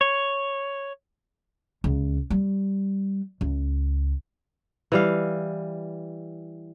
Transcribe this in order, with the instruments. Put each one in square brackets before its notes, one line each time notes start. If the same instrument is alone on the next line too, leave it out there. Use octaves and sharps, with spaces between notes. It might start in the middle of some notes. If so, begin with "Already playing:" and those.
[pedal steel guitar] C#5
[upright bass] C#2
G3
C#2
[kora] E3 G3 F5